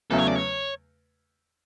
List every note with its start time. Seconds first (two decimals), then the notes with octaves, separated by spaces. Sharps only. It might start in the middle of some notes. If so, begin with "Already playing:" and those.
0.11 E2 C#3 F#3 A3 A4
0.18 C#5
0.27 D5
0.35 C#5